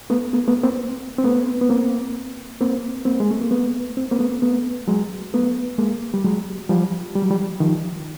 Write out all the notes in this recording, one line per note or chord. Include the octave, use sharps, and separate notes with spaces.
A3 B3
A3 B3
A3 B3
A#3 C4
C4
A3 B3
B3
A#3 C4
A#3 C4
A#3 C4
G#3
A3
A#3
A3 B3
C4
A#3 C4
A3 B3
A3 B3
F#3 G#3
A3 B3
G#3 A#3
G3
F#3 G#3
F3 G3
G3
F#3
F3 G3
D#3 F3